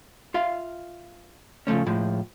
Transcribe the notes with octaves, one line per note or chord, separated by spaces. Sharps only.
F4 E5 F5
C#3 F3 A3 C#4
A2 F3 G#3